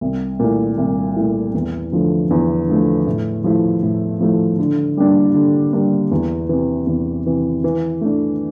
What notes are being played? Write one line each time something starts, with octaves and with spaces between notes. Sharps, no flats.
C2
A#2 A3 E4
C2
A#2 A3 E4
E2
D3 F3 A3
E2
D3 F3 A3
A2
F3 A3 E4
A2
F3 A3 E4
D3
G3 A#3 D4
D3
G3 A#3 D4
E2
C3 E3
E2
C3 E3
E3
A3 D4